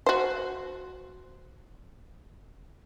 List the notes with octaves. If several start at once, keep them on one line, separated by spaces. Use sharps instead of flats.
F#4 C5